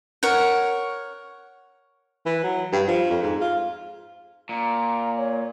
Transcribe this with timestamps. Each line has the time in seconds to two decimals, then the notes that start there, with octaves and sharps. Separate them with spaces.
0.23 A#4 C#5 F#5
2.26 E3
2.43 F#3
2.72 G2
2.87 F3
3.10 F2
3.23 G#2
3.41 F4
4.49 A#2 A#5
5.18 C#5